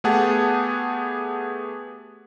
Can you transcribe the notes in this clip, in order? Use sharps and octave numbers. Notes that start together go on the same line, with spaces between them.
A3 B3 G4 G#4 F#5 A5